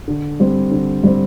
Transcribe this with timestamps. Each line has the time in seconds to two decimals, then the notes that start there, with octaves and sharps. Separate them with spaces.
0.08 D3
0.40 G3 C4
0.71 D3
1.03 G3 C4